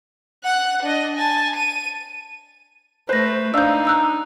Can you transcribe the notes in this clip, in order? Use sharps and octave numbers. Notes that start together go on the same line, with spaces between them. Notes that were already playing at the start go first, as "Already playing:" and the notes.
F#5 F#6
D4 D#5
G#5 A5
D#7
A3 B4 C5 F#6 A#6
D4 D#4 F5 E6 G6
A#5 E6 F#6